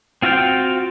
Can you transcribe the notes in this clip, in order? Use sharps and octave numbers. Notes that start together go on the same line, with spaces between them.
C4 F4 F#4 F5 G5